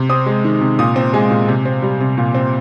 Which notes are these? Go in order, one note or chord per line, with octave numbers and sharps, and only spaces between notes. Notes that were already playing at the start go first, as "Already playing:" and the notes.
Already playing: C3
C4 D#6
G#3
D#3
C3
A#2 D#6
C4
G#3 G#5
A#2
C3
C4
G3
C3
A#2
C4